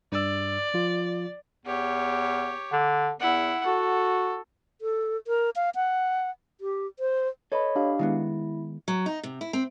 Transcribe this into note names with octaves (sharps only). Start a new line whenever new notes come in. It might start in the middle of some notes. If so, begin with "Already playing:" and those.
G2 D5 E6
F3 F4
E2 G4 C#5
D3
E2 E4 F#5
F#4 A4
A4
A#4
F5
F#5
G4
C5
A4 B4 C#5 D#5 B5
D4 G4 F5
D#3 G#3 B3 E4
F#3
D#4
C3
E4
C4